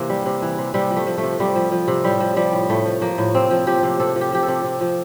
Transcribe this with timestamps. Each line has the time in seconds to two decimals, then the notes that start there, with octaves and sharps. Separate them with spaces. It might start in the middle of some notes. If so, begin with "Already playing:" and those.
Already playing: C3 E3 A#3
0.09 G3
0.26 C3
0.42 E3
0.58 C3
0.74 C3 G3
0.91 F3
0.96 A3
1.07 F3
1.18 A3
1.23 C3
1.40 C3 G3
1.55 F3
1.72 F3
1.88 C3
2.04 A2 G3
2.20 F3
2.37 F3 G3
2.53 A2
2.69 A2 A3
2.86 F3
3.02 F3 A#3
3.18 A2
3.35 C3 C4
3.51 F3
3.67 F3 G4
3.83 C3
4.00 C3 A4
4.16 F3
4.21 G4
4.32 F3 G4
4.43 A4
4.48 C3
4.64 C3
4.81 F3